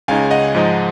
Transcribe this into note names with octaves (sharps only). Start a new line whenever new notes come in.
C#2 C#3 G#3 D#4 F5 G#5
D#5 F#5
G#2 F3 G#3 D#4